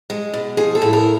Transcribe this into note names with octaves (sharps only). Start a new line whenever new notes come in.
G#3
B2
F3 G#4
A4
A2
A#4